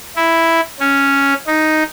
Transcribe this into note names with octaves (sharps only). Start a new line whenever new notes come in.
E4
C#4
D#4